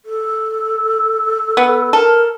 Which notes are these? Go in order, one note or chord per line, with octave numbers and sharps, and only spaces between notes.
A4
B3
A4 A#4